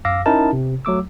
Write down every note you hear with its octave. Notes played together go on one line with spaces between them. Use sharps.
F#2 F5 D6 E6 A#6
C#4 D#4 E4 A#4 A5
C3
F#3 A3 D6 E6